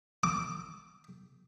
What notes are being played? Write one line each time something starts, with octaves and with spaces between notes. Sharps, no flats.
D6